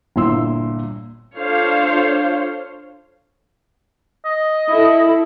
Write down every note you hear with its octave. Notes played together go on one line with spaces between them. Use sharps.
G1 A#2 E4 C6 E6
D4 F4 A4 C5 C#5 F5
D#5
E4 A4